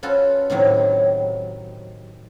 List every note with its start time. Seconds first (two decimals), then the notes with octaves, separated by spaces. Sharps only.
0.03 C#4 F4 F#4 A4 B4
0.50 A2 C3 D#3 F#3